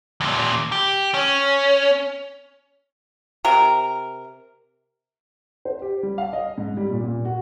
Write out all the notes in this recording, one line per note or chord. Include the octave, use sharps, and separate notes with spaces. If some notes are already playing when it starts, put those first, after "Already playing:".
D#2 A#2
G4
C#4
C3 A#4
C5
G4
G3
F5
D#5
G#2
G3
A#2
A#2
F#4